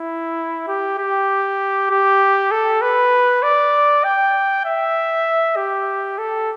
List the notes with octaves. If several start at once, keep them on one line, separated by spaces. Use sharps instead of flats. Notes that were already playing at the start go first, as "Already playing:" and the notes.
Already playing: E4
G4
G4
G4
A4
B4
D5
G5
E5
G4
A4